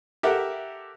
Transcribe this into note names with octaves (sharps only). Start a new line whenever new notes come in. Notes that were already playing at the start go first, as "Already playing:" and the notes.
G4 A4 A#4 E5 F#5